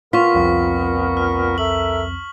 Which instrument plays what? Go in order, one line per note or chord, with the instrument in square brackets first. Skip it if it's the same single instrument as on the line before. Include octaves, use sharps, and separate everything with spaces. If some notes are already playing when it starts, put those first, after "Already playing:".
[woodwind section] A#2 B3 A#4 [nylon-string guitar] F4 [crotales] C#6 B6
[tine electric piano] C2 F2 C4
[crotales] F6
[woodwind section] A4 A#4 E5 [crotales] F#7